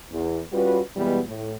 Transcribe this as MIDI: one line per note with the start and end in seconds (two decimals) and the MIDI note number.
0.11 0.39 40
0.52 0.80 55
0.52 0.80 61
0.52 0.80 65
0.52 0.80 66
0.52 0.80 71
0.97 1.20 47
0.97 1.20 52
0.97 1.20 55
0.97 1.20 56
0.97 1.20 59
1.26 1.55 45